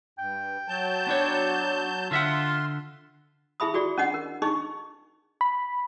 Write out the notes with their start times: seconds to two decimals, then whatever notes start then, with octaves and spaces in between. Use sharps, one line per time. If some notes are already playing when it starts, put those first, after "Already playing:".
0.19 G2 G5
0.68 F#3 A5 G6
1.07 B3 D4 C#5
2.11 D3 F4 E5 F#5 C6
3.60 E4 G#4 E5 B5 D#6
3.74 F4 F#4 G#4 D5
3.98 C#4 D4 D#5 F#5
4.14 A#4
4.42 D4 D#4 G#4 D#5 C#6
5.41 B5